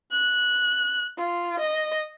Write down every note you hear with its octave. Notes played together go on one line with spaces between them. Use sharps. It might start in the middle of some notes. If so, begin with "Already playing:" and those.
F#6
F4
D#5